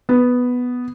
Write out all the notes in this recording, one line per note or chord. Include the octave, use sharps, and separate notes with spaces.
B3